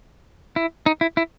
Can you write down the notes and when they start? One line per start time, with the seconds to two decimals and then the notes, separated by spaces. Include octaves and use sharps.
0.56 E4
0.86 D#4
1.01 E4
1.17 E4